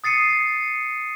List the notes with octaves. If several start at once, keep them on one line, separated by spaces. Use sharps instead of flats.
D#6 A6 C7 C#7 D#7